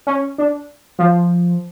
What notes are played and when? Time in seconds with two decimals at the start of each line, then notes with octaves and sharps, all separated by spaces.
0.07 C#4
0.38 D4
0.99 F3